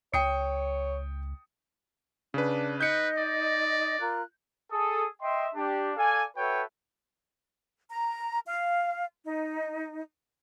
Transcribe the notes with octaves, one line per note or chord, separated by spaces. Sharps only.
C#2 C#5 G5 D#6 C#7
C#3 D4 B4
D#4 B4 D#5 G6 C#7
D5
F4 A#4 F#6
G#4 A4 D#6
D#5 E5 G5 C6
D4 G4
A4 D5 F5 G#5
F#4 A4 B4 C#5 E5 G5
A#5
F5
D#4